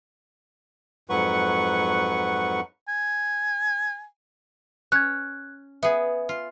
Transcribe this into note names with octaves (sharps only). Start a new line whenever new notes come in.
F2 G#2 F#3 B4 F#5 C#6
G#5
C#4 F#6 G#6
B3 G#4 E5
F4